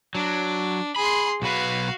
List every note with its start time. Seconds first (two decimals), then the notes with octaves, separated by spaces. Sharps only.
0.15 F#3 D4
0.96 G#4 B5 C6
1.42 B1 F#4 B4 F5